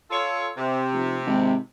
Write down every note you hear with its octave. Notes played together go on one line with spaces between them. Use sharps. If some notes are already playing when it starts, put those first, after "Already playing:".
F4 A4 C#5
C3
F1
G#1